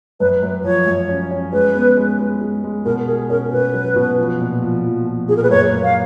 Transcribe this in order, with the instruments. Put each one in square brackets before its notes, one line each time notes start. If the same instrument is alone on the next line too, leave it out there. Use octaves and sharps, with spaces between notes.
[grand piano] F#2 [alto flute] B4
[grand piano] F#2
[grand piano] F3 [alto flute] C#5
[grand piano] F#2
C#4
C#4
[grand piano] G#3 [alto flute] B4
[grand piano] B3
G#3
G#3
G#3
G#3
[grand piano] B2 [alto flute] A#4
[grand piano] G#4 [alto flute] A#4
[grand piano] C#4 [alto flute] A#4
[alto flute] A#4
[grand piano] B2 [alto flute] B4
[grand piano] F#3
B2
F3
A#2
F3
F3
F3
[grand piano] A#2 [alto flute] G#4
[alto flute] A#4
B4
[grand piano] F#2 [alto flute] C#5
[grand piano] A#3
[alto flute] F5